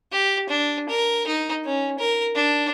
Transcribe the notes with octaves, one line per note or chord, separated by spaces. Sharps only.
G4
D4
A#4
D#4
C#4
A#4
D4